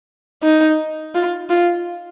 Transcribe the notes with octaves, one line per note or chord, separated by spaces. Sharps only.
D#4
F4
F4